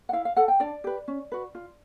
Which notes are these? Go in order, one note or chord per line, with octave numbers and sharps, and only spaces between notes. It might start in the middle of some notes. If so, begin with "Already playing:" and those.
F#5
E4 F5
F5
A4 F#5
G5
D4 D5
G4 B4
C#4
F#4 B4
F4